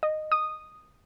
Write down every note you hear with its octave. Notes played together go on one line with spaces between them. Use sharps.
D#5
D#6